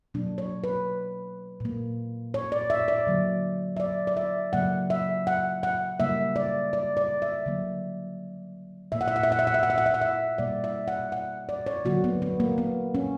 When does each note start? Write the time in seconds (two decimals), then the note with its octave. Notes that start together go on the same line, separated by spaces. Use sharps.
0.14 B2 F#3 A#3 D4
0.38 C#5
0.64 B4
1.60 A#2 A#3
2.34 C#5
2.52 D5
2.70 E5
2.88 D5
3.07 D3 F#3 A#3
3.77 E5
3.80 D5
4.07 D5
4.17 E5
4.53 C#3 F#3 A#3 F#5
4.90 E5
5.27 F#5
5.63 F#5
6.00 C#3 G3 A#3 E5
6.36 D5
6.73 D5
6.97 D5
7.22 E5
7.46 D3 F#3 A#3
8.92 A#2 A#3 E5
9.01 F#5
9.08 E5
9.16 F#5
9.23 E5
9.32 F#5
9.39 E5
9.47 F#5
9.54 E5
9.63 F#5
9.70 E5
9.78 F#5
9.86 E5
9.94 F#5
10.01 E5
10.38 B2 G3 A#3 D5
10.64 E5
10.88 F#5
11.12 F#5
11.49 D5
11.66 C#5
11.85 D3 F#3 A#3 F#4
12.04 B3
12.22 B3
12.40 A#3
12.58 B3
12.95 C#4